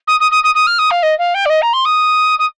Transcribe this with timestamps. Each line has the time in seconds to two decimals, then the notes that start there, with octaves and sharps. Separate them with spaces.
0.07 D#6
0.20 D#6
0.31 D#6
0.44 D#6
0.55 D#6
0.67 F6
0.79 D#6
0.91 F5
1.03 D#5
1.19 F5
1.34 G5
1.46 D5
1.50 D#5
1.62 A#5
1.73 C6
1.85 D#6
2.39 D#6